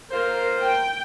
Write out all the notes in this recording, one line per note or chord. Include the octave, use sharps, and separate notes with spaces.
A#3 F4 A#4 C5
G5